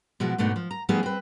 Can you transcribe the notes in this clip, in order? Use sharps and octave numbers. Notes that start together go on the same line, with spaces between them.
B2 F3 G#3 E4 F#4
G#2 B2 A3 B3 D4 D#4
F3
A#5
F3 G3 A3 B3 D#4 G#4
C4 B4